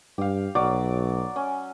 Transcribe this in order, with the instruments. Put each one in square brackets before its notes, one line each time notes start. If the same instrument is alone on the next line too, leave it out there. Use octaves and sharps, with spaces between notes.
[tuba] G2 [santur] G4 F5
[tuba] B1 [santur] F#3 D5 D6
[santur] C#4